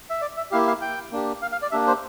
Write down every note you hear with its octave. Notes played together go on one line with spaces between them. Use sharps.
E5
D5
E5
A#3 E4 G4 F5
F5
G5
A#3 D4 G4
F5
F5
D5
A#3 D4 G4 E5
C5